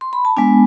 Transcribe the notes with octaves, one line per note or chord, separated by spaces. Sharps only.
C6
B5
A5
G#3 B3 D4 G#5